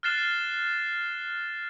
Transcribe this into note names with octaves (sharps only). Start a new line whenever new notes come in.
F6 F#6 A6 C7 E7 G7